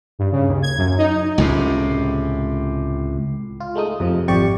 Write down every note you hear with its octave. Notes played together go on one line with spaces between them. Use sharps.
G2
C#3
D#2
G#6
F#2
D#4
C#2 A2 C3
F4
G#3 A3 D#4 D#6
F2 C3 F3
G#1 F2 C3 G4 D5 C#6